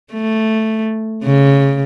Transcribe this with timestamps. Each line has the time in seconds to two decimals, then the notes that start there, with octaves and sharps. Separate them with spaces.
0.14 A3
1.24 C#3